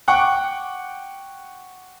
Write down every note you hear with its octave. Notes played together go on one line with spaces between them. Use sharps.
F#5 G5 C#6 D6 F#6